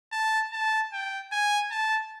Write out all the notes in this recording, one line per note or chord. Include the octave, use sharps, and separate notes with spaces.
A5
A5
G5
G#5
A5